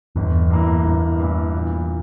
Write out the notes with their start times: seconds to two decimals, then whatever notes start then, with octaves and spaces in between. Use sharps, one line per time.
0.16 G1 E2
0.50 G2 E3 A#3 E4
0.85 G1
1.19 G2 E3 A#3 E4
1.53 A#2